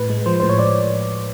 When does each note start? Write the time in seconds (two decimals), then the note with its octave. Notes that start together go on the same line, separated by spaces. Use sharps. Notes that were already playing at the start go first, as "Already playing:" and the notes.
Already playing: A2 B4
0.10 G#3
0.26 F3 C5
0.40 A2 C5
0.49 C#5
0.59 A2 D5